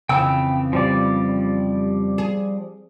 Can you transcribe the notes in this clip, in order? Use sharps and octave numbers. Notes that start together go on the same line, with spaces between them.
F2 C#3 E3 G5 E6
F3 G3 D5
G#4